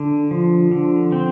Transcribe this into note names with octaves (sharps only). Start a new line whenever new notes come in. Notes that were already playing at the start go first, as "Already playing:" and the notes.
Already playing: D3
F3
D3
C4